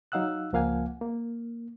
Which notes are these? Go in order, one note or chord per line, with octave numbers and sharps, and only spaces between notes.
F#3 D#4 F5 F#5 E6 F#6
C#2 F3 A#3 F5 F#5 G#5
A#3